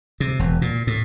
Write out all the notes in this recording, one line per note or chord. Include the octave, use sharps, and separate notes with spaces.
C3
E1
A#2
A2